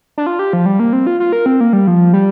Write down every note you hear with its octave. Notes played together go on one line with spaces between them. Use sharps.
D4
F4
G4
F3
G3
A#3
C4
F4
F4
A#4
C4
A#3
G3
F3
G3